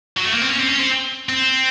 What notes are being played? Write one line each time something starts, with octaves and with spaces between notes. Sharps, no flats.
F#3
A3
A#3
C4
C#4
C4
C#4
C4
C4